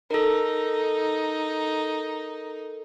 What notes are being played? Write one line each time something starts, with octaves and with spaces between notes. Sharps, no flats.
D#4 A4 A#4